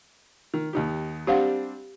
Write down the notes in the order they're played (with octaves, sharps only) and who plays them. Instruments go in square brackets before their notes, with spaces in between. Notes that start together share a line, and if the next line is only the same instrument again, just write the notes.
[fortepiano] D#3
D#2 D#4 G4
[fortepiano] G3 C4 D4 [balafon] G4 F5 F#5